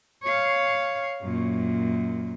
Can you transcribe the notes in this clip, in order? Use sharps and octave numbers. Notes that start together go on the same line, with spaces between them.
C#5 F5
F#2 A#2